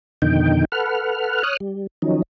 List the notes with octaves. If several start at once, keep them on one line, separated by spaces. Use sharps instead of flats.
F2 B2 D3 D#3 D#4 G5
A4 B4 F#5 F6
C#5 D#6 F6 F#6
G3
D#3 F3 F#3 C#4 D#4